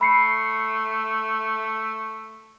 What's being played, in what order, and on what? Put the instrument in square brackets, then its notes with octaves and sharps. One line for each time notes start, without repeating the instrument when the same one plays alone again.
[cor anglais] A3 [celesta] B5 C7 C#7